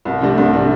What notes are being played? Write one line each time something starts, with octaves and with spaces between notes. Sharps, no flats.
C2
C3 A3 D4
C2
C3 A3 D4